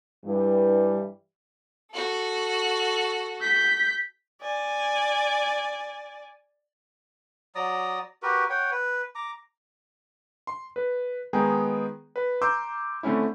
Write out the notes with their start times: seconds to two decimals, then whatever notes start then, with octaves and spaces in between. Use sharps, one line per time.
0.25 G2 E3 G3
1.91 F#4 A4
3.41 G6 B6
4.42 D5 G#5
7.55 F#3 D5 A#5 D#6
8.22 F#4 G4 A#4 B4
8.50 C#5 F#5 G5
8.71 B4
9.15 A#5 D6
10.47 C6
10.76 B4
11.33 D#3 G#3 B3 G#4 G5 A#5
12.16 B4
12.42 A#5 C6 D6 E6 G6
13.03 D3 A3 C4 C#4 E4